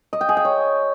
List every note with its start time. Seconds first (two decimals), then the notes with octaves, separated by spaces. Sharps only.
0.13 D#5
0.21 G5
0.29 G#4
0.37 G5
0.45 C#5